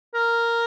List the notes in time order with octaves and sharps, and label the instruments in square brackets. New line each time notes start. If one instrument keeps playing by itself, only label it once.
[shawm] A#4